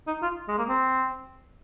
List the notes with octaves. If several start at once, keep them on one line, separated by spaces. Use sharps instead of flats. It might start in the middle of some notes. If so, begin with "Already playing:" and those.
D#4
F4
G#3
A#3
C4